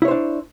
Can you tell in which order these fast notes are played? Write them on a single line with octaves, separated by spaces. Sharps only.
E4 C#5 C5 D4